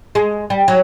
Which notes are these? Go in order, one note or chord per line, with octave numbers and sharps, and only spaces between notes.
G#3
G3
F#3